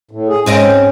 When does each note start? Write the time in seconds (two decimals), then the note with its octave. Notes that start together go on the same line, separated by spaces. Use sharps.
0.11 A2
0.28 G#4
0.46 G#2 C4 C#4 D#5